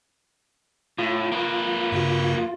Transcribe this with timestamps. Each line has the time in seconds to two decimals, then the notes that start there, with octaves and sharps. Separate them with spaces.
0.98 A2 F4
1.32 A#3 B4
1.92 G2 C#3 F#4